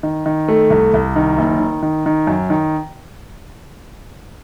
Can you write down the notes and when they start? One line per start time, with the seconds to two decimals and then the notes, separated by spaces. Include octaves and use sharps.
0.03 D#3
0.26 D#3
0.48 A3
0.70 C2
0.93 C2
1.16 D#3
1.38 F#1
1.60 D#3
1.83 D#3
2.06 D#3
2.27 F#2
2.50 D#3